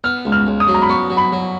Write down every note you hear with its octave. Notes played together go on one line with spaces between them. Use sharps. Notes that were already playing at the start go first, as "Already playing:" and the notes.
B3 F6
C#2
F6
C#2
D#6
F#3
A#5
B5
B3 C#6
F#3
B5
F#3